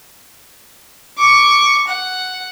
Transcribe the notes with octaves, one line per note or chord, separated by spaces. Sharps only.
C#6 D6
F#5